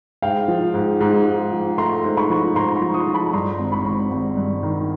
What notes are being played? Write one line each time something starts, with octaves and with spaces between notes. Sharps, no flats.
G#2 F5 G5
F3
G#2
G#2
G#2
F3
A3 A#5 C6
G#2
B5 C#6
F3
G#2 A#5 C6
B5 C#6
F3
C#6 D#6
F3
A5 B5
G2 A#5 C6
G#1
B5 C#6
G#1
G#1
G2
D#3